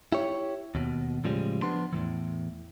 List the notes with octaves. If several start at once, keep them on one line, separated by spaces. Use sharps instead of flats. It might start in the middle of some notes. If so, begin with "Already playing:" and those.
E4 G4 C#5
D#2 B2
A2 C#3 F3 G3 G#3
F3 B3 D4 C6
E2 A2 E3